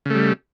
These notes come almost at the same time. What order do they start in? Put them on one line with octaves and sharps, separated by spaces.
C#3 A3 G3